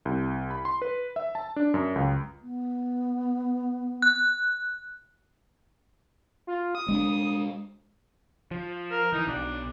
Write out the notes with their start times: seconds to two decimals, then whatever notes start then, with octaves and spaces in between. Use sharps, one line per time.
0.05 C2
0.51 B5
0.65 C6
0.82 B4
1.16 E5
1.35 A5
1.56 D4
1.74 F#2
1.96 C#2
2.43 B3
4.02 F#6
6.47 F4
6.75 D#6
6.88 G#3 C#4 D4
8.51 F3
8.91 A#4
9.13 E3 D#4
9.27 B1 D4